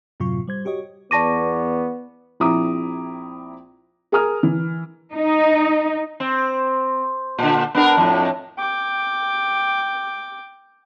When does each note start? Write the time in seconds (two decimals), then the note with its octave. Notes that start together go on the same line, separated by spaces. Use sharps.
0.20 F#2 A2 C3 F#3 F4 C#6
0.48 G3 C5 G#6
0.65 F#4 G4 C#5 D#5
1.11 E2 B3 D5 A5 C#6 D6 A#6 D#7
2.40 A#1 C4 E4 A#5 D6 D#6
4.12 G#4 A#4 G#5 A#5 D#6 F6
4.43 E3
5.13 D#4
6.20 C4
7.38 A#2 D3
7.75 B3 D4 A#4
7.97 F2 A2
8.59 G5 D6